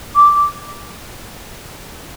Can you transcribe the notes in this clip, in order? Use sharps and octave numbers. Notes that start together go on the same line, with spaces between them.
D6